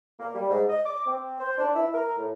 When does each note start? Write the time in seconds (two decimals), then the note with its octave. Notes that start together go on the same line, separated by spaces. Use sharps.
0.19 A#3
0.35 G3
0.49 G#2
0.68 D#5
0.85 D6
1.06 C4
1.39 C5
1.58 D4
1.74 E4
1.94 A#4
2.16 A2